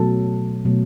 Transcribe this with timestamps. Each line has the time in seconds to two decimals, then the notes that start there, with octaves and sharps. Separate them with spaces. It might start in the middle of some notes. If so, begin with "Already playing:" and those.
Already playing: B2 F#3 A3 A4
0.65 B2 F#3 A3